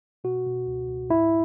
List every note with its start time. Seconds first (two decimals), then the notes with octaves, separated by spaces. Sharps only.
0.24 B2 F#4
0.46 B2
0.67 C#2
0.88 C#2
1.10 G#2 E4